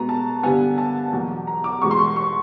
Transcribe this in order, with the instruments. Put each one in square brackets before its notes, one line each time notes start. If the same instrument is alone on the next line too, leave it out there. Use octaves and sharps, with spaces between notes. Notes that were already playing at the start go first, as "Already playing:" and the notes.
Already playing: [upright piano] B2 G#3 B3 A#5
A5
G2 D3 G3 B3 G#5
A5
E2 B2 F#3 A#3
A#5
D6
E2 B2 G#3 C#6
C6
C#6
C#6